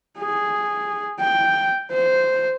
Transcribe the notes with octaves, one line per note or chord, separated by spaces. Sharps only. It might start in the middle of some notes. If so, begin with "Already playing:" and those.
G#4
G5
C5